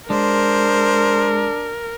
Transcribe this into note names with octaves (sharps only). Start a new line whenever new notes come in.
G#3 D4 A#4 C5